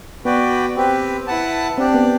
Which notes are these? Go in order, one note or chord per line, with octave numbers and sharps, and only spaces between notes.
B3 F#4 B4 D5 G5
C4 G4 B4
E4 B4 F#5 A5
C4 D4 G4 D5
B3